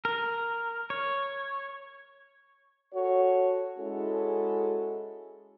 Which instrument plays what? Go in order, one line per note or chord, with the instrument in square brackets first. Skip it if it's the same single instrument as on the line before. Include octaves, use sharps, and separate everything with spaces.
[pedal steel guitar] A#4
C#5
[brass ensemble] F#4 A4 C#5
G#3 C#4 E4 F#4 G#4 A4